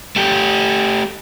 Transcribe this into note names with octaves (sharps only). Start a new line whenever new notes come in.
A3 G4